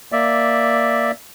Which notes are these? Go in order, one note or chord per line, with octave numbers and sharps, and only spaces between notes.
A#3 D5 E5